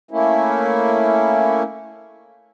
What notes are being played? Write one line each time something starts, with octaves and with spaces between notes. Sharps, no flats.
A3 A#3 C#4 E4